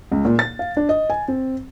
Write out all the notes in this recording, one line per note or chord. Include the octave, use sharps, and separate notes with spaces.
C#2
A#2
A6
F5
D4
D#5
G#5
C4